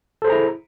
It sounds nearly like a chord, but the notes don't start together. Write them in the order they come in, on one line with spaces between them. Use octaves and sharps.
A4 C5 G#4 A#5 E4